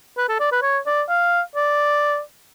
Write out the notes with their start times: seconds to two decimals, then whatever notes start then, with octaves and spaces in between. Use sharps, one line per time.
0.17 B4
0.29 A4
0.40 D5
0.52 B4
0.62 C#5
0.86 D5
1.09 F5
1.56 D5